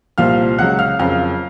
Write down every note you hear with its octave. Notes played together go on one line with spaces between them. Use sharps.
C2 A#2 F3 F5 F6
C#2 C#3 F#3 F#5 F#6
F5 F6
F#1 F2 C#3 F#3 F5 F6